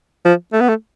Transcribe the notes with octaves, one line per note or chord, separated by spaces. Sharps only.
F3
A3
B3
A3